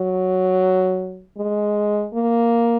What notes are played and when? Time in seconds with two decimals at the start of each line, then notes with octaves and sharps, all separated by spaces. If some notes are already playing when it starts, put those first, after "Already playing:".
Already playing: F#3
1.38 G#3
2.14 A#3